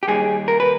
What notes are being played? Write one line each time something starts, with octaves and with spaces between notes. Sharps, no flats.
G4
D#2 D#3 G3 G#4
A#4
B4